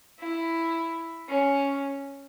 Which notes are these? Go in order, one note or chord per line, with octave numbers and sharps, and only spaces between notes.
E4
C#4